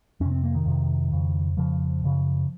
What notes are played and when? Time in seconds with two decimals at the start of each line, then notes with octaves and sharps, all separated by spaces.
0.20 F2 C3 C#4
0.31 C4
0.44 A#3
0.55 D#3
0.65 F2 C3
1.12 F2 C#3
1.57 F2 C#3 F3
2.03 F#2 C#3